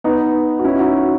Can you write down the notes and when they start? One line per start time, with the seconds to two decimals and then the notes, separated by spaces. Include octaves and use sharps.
0.04 B3 D#4
0.59 F#4
0.65 C#4 E4
0.79 D#4 F#4